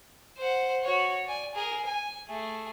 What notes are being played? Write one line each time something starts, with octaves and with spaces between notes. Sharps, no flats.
C5 F#5
F#4 C#5
D5 G#5
G#4 A#4
G#5
A3 G#4